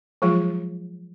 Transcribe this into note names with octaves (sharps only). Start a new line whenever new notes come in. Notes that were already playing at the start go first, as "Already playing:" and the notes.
F3 F#3 G#3 F4 G#4